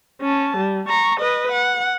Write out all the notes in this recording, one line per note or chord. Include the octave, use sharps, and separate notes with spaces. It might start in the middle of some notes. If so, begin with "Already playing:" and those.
C#4 A5
G3
A#5 C#6
B4 D#5
F#5